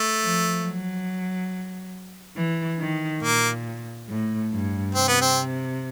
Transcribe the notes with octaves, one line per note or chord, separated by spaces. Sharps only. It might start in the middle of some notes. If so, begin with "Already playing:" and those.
Already playing: A3
F3
F#3
E3
D#3
A#2 A#3
A2
G2
C3 C4
B3
C4